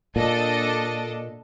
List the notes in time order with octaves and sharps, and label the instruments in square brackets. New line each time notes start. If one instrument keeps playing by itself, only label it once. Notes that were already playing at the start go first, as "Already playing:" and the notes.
[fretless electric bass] A#2 [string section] D4 A4 D#5